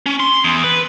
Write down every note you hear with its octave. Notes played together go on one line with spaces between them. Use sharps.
C#4
C6
E2
B4